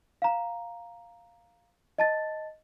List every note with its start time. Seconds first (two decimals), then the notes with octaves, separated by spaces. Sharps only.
0.22 F5 A#5
1.98 D#5 A5 A6